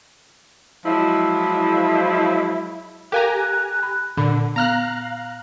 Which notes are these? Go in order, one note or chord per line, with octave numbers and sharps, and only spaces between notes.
F3 F#3 G#3 E4
G4 A4 A#4 F5 G#5 A#5 F#6
B5
A#2 D3 B5
B3 F5 A#5 F6 F#6